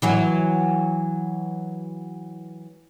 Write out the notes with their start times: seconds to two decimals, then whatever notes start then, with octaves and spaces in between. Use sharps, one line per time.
0.02 E3 F#3 F#4